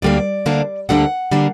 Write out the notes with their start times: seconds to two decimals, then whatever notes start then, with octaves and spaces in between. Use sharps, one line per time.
0.02 D2 D3 G3 A#3 D4 D5
0.46 D2 D3 G3 A#3 D4
0.89 D2 D3 G3 A#3 D4 F#5
1.31 D3 G3 A#3 D4